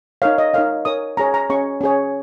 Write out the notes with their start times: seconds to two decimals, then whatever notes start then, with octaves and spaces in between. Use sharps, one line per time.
0.22 D#4 A#4 C#5 F5
0.38 D#5
0.54 D#4 A#4 C#5 F5
0.85 D#4 A#4 C#5 D#6
1.17 C#4 G#4 C#5 A#5
1.34 A#5
1.50 C#4 G#4 C#5 C#6
1.81 C#4 G#4 C#5